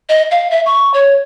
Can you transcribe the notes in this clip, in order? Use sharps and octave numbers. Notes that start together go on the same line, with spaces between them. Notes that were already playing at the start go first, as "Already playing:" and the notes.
D#5
F5
E5
C#6
C#5